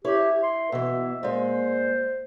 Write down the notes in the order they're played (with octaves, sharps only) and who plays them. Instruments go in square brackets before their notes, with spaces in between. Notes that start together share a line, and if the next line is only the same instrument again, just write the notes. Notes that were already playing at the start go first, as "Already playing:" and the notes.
[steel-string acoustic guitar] E4 C#5 [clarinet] G4
[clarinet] C6
[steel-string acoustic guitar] B2 E3 [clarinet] E5
[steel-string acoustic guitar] A#2 G#3 [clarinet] C5